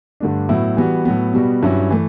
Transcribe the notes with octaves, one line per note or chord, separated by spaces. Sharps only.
G2 D3 A3 D4
A2 F#3 B3 E4
E3 G3 B3 F#4
A2 F#3 B3
B2 G3 B3 F#4
G2 F#3 C#4 E4
E3 A3